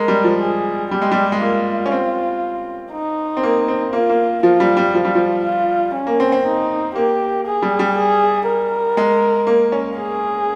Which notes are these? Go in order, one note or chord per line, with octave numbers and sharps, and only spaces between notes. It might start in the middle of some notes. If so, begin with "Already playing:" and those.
Already playing: G#3 A#4
G3
F3
G#4
G3 G4
G#3
G3
G#3
A#3 F4
C#4
C4
D#4
C4
A#3
C4
A#3 F4
A#3
F3 F4
G3
G3
F3 F4
G3
F3
F4
C#4
A#3
C4
C4
D#4
A#3 G4
G#4
G3
G3
G#4
A#4
G#3
A#3
C#4
G#4